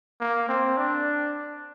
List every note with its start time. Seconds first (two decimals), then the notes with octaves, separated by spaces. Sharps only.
0.21 A#3
0.49 C4
0.78 D4